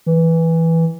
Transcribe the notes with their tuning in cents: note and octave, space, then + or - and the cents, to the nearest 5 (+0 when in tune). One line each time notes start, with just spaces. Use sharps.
E3 -5